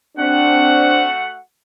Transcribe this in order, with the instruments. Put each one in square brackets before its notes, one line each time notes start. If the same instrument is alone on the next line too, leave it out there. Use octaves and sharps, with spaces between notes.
[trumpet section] A3 F#4 F#5 [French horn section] C4 D4